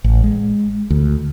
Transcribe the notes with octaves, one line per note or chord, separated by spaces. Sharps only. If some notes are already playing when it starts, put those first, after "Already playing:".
A1
G#3
D2